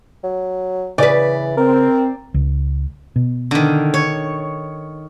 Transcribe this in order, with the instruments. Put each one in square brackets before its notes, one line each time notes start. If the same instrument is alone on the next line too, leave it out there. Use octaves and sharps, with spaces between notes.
[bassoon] F#3
[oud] C#3 B4 [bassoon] E3 [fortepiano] D5
[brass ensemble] C4 [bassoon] A#4
[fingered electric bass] C#2
B2
[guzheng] D3 D#3
C#5